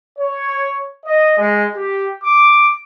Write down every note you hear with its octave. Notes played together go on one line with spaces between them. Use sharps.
C#5
D#5
G#3
G4
D6